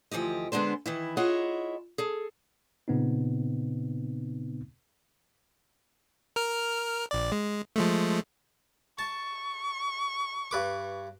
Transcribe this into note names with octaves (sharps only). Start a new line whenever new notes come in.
D2 E3 F3 G4 D#5
D3 G#3 B3 D4 C5
D#3 E3 E4
E4 F4 G#4 C#5 D#5 F#5
G#4 A4
A#2 C#3 B3 C4 D#4
A#4 F6
A#1 D5
G#3
F3 G#3 A3
A5 C#6
G2 B4 D6